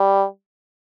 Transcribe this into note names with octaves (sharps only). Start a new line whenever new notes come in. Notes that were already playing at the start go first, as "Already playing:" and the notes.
Already playing: G3